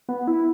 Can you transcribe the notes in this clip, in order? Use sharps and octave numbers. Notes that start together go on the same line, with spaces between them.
B3
E4